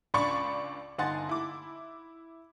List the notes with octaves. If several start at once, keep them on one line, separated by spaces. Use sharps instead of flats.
C#2 D4 D5 B5 C#6 C#7
G1 D#4 F#5 G#5 C6 A6
E4 D6